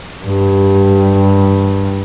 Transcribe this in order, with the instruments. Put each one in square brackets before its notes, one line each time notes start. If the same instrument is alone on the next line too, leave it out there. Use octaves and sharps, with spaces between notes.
[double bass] G2 G3